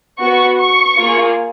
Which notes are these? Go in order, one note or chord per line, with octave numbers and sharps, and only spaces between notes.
B3 F#4 C#6
C#6
A#3 F4 G#4